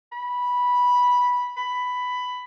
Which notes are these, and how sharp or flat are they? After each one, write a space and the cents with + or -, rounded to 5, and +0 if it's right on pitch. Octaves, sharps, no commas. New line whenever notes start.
B5 -10
B5 +10